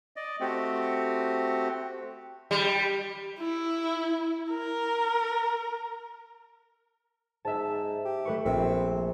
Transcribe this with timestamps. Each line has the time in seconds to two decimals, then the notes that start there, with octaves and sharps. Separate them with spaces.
0.16 D5 D#5
0.41 A3 C4 F#4 G4
2.51 G3
3.39 E4
4.51 A#4
7.45 G#2 E5 A5
8.05 G4
8.25 A3 B4 C#6
8.45 A#1 A#2 A#3 C4